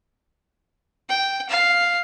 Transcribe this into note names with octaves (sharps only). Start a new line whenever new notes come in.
G5
F5